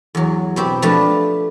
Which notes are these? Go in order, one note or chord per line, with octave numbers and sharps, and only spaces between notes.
E2 F#3
B2 C4 G4
F3 A3 D4 B4 A5